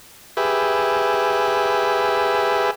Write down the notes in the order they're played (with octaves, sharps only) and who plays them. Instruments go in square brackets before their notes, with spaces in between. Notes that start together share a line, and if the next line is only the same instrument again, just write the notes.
[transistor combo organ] G4 G#4 B4 E5